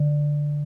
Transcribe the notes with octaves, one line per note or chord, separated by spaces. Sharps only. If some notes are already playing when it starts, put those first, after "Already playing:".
Already playing: D3